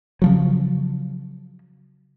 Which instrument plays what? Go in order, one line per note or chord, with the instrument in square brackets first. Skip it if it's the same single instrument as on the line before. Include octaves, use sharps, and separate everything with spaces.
[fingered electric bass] C#3 F3 F#3